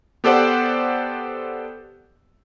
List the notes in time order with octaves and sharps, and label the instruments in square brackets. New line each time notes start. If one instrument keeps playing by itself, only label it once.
[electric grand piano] B3 G4 A4 C5 D5 F#5